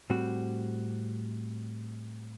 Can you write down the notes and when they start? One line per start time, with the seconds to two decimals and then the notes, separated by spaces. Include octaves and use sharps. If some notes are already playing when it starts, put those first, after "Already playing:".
0.10 A2 G3 C4 F#4